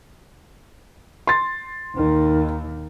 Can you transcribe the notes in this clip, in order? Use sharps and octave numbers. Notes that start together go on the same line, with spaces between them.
C6 A6
D#2 D#3